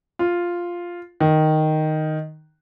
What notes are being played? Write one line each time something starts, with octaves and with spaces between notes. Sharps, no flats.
F4
D#3